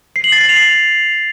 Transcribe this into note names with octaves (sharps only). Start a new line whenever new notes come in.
C7
F#7
A6
C7
F7